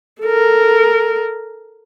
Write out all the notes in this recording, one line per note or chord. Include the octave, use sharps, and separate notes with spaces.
A4 A#4